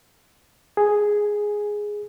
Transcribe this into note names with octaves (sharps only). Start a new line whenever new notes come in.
G#4